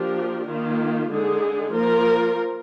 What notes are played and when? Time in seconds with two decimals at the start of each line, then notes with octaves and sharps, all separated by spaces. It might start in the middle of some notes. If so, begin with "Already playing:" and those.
Already playing: F3 A#3 D4 G4 A#4
0.47 D#3 A#3 F4
1.10 D3 G#3 D#4 G#4
1.73 F3 A#3 F4 A#4